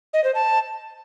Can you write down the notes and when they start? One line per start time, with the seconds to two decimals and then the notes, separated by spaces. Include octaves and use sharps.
0.14 D#5
0.24 C5
0.35 A5